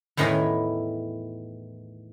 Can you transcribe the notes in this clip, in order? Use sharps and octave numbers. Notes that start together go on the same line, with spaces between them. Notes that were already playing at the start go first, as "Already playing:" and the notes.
E2 A2 D#3 E3 D#5 G#5